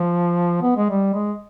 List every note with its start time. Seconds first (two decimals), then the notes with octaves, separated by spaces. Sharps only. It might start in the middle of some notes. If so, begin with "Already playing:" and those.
Already playing: F3
0.62 B3
0.77 G#3
0.90 G3
1.13 G#3